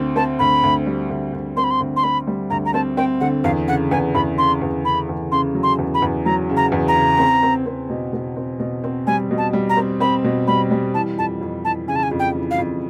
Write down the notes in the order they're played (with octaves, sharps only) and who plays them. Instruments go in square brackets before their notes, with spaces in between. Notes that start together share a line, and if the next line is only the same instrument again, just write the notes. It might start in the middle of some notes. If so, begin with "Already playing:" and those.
Already playing: [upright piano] D2 C4
[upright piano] C4 [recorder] A5
[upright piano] D2 [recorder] B5
[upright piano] D2
G3
D2
D2
[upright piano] C4 [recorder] C6
[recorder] B5
C6
[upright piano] D2
[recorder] C6
[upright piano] C4 [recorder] B5
[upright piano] G3
[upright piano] D2 [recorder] A#5
[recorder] A#5
[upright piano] C4 [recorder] A5
[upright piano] C4 [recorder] G5
[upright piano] D3 [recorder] F#5
[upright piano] E2 [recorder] F5
[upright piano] C#3 [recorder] F#5
[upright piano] E2 [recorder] G#5
[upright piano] E2 [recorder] B5
[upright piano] C#3 [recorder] C6
[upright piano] E2
[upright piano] C#3 [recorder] B5
[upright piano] E2
[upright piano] C#3 [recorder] C6
[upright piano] F#3
[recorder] C6
[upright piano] E2
[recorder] B5
[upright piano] E2
[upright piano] F#3 [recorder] A#5
[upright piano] C#3
[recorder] A#5
[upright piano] E2
[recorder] A#5
[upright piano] C#3
C4
C4
C4
B2
B2
C4
B2
C4
[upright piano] G3 [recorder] G#5
[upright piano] B2
[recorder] A5
[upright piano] G3
[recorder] A#5
[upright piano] C4
[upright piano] C4 [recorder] B5
[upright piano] B2
[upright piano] G3 [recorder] B5
[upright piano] G3
[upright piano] E3 [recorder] A5
[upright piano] F2 [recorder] A5
[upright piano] F2
[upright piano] E3 [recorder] A5
[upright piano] C#3 [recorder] G#5
[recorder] A5
G#5
[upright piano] F2
[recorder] G5
[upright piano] E3
[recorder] F5
[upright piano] F2